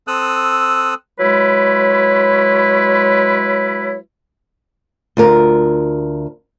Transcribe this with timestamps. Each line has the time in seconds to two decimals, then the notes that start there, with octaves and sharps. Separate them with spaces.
0.07 C4 A4 D#6 E6 F#6
1.18 F#3 G#3 E4 B4 C#5
5.17 D2 F4 A#4